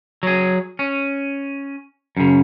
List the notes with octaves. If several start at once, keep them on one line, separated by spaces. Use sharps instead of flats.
F#3 G#4
C#4
F#2 C#3